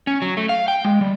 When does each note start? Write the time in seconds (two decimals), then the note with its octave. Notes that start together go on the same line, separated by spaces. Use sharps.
0.07 C#4
0.22 F#3
0.37 A3
0.49 F5
0.68 G5
0.85 G#3
1.01 G3